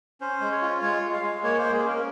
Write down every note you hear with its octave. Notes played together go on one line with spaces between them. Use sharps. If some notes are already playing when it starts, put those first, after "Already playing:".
C#4 C5
G#3
C#5
F4
G#3 C#5
G#3
F5
G#3
A#3 C#5
C5
A#3
G#4
C#4 A#4